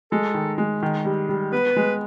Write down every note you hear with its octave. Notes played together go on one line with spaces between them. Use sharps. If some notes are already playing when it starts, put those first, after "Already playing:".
G#3 A4
D#3
G#3
D#3
G3
G3
B3 B4
G#3